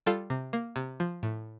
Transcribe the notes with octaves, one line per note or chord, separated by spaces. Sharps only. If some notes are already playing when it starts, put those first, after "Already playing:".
G3 F4 A4
C3
A#3
C3
F3
A2